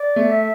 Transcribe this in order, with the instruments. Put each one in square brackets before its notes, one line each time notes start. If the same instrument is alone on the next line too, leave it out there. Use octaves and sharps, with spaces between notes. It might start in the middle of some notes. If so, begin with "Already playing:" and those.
Already playing: [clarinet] D5
[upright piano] A3
[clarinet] E5